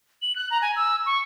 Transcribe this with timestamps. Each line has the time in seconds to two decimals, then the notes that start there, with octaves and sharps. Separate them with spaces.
0.22 F#7
0.36 F#6
0.50 A#5
0.62 G#5
0.76 E6
1.06 C#6